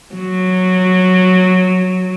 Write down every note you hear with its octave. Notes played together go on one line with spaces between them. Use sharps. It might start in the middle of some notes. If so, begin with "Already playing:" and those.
F#3